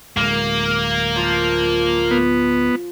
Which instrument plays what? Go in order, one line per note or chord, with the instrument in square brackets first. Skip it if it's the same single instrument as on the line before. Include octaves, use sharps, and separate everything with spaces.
[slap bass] D1 G#3 [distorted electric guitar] A#3
[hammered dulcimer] F3
[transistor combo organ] B3